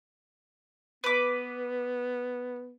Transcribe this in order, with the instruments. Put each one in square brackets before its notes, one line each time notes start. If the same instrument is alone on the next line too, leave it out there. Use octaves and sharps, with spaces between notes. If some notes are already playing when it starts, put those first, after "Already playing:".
[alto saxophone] B3 [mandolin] B4 D6